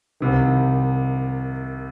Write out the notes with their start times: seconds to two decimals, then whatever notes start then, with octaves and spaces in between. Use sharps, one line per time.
0.20 C2 C3 D#3